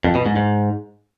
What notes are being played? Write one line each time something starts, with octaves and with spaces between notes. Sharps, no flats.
F2
B2
G#2
G#2